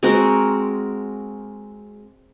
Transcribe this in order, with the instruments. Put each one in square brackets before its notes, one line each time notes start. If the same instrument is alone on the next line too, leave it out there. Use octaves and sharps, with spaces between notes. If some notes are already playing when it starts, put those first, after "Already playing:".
[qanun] G#3 C4 F#4 A#4